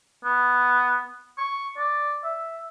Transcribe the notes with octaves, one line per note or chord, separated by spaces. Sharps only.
B3
C#6
D5
E5